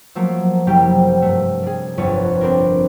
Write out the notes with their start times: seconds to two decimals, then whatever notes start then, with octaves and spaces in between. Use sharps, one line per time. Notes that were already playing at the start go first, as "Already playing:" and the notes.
0.15 F3 F#3 A3 A#3
0.67 F#1 C3 F#3 G3 G4 G5
1.22 G2 A3
1.63 G3 G#4
1.97 G1 F2 B4 C#5
2.41 C4 D4 A#4